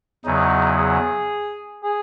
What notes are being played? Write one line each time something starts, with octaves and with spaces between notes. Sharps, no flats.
E2 C#3 F#3 D#4
G#4
G#4